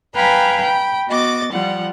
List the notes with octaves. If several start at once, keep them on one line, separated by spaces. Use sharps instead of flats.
B4 F5 G5 G#5 A#5 B5
G5 B5
B3 F#4 D#5 D6 A6
F3 G3 F4 F#5